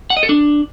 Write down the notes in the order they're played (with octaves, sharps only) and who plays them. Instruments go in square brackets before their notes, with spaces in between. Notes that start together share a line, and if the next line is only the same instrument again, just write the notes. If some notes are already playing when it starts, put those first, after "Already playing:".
[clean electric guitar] F#5
D#5
A4
D4